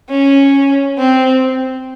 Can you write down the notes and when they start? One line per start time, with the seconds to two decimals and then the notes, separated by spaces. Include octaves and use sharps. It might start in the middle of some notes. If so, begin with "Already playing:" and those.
0.10 C#4
0.98 C4